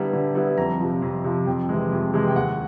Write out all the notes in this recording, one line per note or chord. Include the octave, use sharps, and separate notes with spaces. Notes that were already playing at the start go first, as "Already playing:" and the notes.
Already playing: D3 G3 B3 E4 A#5
D3
G3 B3 E4
F2 A#5
C3 F3
F2
C3 F3
F2 G5
C3 E3 G#3
F2
C3 E3 G#3
G5
D#2 F#5